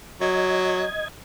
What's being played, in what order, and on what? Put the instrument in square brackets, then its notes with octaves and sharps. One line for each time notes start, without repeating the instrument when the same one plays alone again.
[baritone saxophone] F#3 [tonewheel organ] D#5 G#6